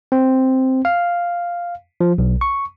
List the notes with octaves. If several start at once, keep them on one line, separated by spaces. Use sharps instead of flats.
C4
F5
F3
B1
C#6